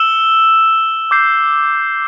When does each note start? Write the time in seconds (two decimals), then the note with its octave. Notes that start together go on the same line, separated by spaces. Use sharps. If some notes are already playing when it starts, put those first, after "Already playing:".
Already playing: E6 E7 G7
1.11 D6 G6 C7